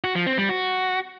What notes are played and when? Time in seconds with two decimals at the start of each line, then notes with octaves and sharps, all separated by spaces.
0.04 F#4
0.15 F3
0.27 C4
0.38 G3
0.49 F#4